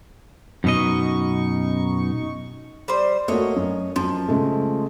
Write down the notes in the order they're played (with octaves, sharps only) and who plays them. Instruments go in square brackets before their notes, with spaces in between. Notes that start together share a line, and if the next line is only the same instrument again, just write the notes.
[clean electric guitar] F#2 B2 D#5 [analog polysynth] D#4 C#6
[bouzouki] G3 C5
[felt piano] A3 A#3 F#4 [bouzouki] C#5 D#5
[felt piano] F#2
[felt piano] F#2 [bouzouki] F3
[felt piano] C#3 G#3 A3